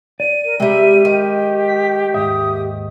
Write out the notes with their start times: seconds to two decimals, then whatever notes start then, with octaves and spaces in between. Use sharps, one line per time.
0.20 D5 D#7
0.45 A#4
0.60 C3 G3 G#3 E5
1.05 D#3 G4
1.67 B6
2.14 D#2 G#2 E5 D#6